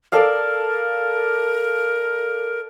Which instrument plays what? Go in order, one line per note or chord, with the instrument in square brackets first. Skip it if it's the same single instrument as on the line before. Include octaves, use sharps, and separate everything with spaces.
[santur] A4 D5 F5 [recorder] A#4